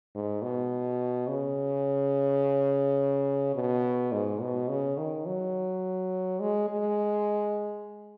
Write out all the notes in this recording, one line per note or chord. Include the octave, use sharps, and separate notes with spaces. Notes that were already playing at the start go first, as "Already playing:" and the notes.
G#2
B2
C#3
B2
G#2
B2
C#3
D#3
F#3
G#3
G#3